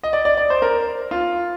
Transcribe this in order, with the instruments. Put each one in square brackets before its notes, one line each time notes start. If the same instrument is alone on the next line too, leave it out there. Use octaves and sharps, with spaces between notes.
[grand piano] D#5
D5
D5
D5
C5
A#4
F4